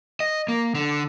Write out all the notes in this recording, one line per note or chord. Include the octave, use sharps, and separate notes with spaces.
D#5
A#3
D3